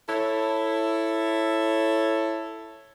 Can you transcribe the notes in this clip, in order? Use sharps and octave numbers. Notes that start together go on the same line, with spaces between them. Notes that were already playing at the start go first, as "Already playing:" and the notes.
E4 A4 C#5